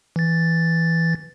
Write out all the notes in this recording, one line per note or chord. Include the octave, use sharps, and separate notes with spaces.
E3 A6